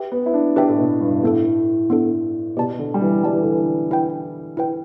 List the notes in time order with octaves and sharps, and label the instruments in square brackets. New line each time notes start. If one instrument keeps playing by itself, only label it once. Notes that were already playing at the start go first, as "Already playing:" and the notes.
Already playing: [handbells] G4 B4 E5 G5
[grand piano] B3
E4
D4
[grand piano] D4 [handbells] G4 B4 E5 G5
[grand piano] A2
B2
G2
[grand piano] A2 [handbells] B3 D4 A4
[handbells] B3 D4 A4
[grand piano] B2 [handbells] G4 D5 A5
[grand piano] D3
G3
E3
[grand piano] G3 [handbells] G4 D5 A5
[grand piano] E3
D3
E3
[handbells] E4 B4 G5
E4 B4 G5